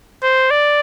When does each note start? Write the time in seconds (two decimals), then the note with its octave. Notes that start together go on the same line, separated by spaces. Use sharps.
0.23 C5
0.51 D5